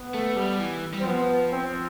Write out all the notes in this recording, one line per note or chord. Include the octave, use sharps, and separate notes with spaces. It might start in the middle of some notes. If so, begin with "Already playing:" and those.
Already playing: B3
A3
G3
E3
G3
C4
F3 B3
C4